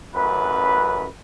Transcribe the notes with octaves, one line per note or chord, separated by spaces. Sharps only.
A1 F#2 B4